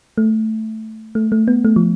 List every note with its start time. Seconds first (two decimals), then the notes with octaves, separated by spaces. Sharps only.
0.18 A3
1.15 A3
1.32 A3
1.48 B3
1.65 A3
1.76 F3